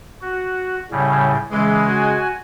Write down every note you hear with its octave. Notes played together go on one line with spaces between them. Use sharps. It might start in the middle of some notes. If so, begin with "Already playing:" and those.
F#4
A2 C#3 G3
C#3 E3 G#3
F#4 G#5